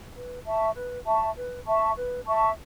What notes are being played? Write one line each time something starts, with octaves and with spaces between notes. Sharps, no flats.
B4
E5 A5 C#6
B4
E5 A5 C#6
B4
E5 A5 C#6
B4
E5 A5 C#6